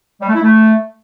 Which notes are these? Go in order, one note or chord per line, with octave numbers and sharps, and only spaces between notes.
G3
A3
E4
A3